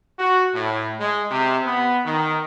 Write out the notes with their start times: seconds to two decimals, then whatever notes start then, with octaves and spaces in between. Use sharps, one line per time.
0.19 F#4
0.54 A2
1.00 G#3
1.31 C3
1.65 B3
2.05 D#3